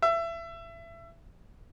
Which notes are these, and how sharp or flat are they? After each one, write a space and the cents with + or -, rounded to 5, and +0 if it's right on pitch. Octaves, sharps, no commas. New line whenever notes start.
E5 +25